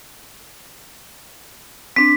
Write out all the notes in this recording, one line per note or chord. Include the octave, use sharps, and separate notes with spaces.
C4 D4 B6